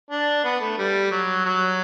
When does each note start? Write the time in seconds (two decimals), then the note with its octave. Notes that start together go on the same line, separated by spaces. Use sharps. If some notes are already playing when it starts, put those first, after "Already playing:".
0.11 D4
0.45 B3
0.61 A3
0.78 G3
1.11 F#3
1.46 F#3